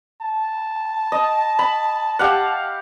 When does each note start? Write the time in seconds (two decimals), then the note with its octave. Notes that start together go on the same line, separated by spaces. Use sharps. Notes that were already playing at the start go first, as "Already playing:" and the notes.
0.21 A5
1.12 D#5
1.59 B5
2.19 G4 F5 F#5